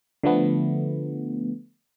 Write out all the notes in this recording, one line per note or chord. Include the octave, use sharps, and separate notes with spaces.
D3 F3 A3 B3